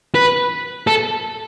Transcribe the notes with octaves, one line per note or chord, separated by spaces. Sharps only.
B4
A4